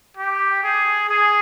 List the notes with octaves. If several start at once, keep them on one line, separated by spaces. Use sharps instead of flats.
G4
G#4
G#4